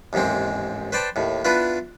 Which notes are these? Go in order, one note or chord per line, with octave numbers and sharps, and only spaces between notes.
A1 D#2 G#2 G#3 C4
B4 C5 D5 G5 A5
D#2 A2
B3 D4 E4 F4 B4